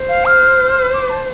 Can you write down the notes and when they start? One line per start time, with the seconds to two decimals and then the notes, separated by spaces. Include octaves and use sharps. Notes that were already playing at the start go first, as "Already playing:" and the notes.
Already playing: C5
0.09 F5
0.26 F6
0.94 D6
1.09 A5